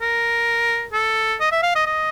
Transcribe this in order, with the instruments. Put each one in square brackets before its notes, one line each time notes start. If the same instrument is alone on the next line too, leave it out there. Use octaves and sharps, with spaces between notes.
[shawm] A#4
A4
D#5
E5
F5
D#5
D#5